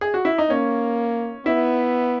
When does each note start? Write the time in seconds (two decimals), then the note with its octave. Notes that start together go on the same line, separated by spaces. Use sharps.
0.01 G#4
0.14 F#4
0.25 E4
0.38 D#4
0.50 A#3 C#4
1.46 B3 E4